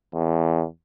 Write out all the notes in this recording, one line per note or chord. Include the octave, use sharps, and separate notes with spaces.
E2